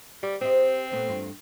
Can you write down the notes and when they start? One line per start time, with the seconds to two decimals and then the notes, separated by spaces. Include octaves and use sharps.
0.23 G3 G4
0.41 C4 G4 C5 D#5
0.92 A#2 A3 B3
1.09 E2 G2 F4